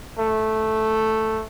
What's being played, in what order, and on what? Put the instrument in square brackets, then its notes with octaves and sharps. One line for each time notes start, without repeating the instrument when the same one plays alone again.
[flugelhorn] A3